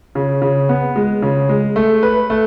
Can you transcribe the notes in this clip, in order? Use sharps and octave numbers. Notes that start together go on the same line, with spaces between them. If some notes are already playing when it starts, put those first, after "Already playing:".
C#3
C#3
B3
G#3
C#3
G#3
A3
B4
A3